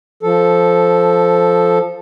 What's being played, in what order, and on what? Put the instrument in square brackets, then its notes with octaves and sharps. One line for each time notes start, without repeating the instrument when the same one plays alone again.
[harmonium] F3 A4